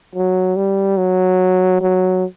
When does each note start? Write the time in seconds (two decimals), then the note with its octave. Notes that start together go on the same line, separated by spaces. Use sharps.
0.15 F#3
0.56 G3
0.97 F#3
1.81 F#3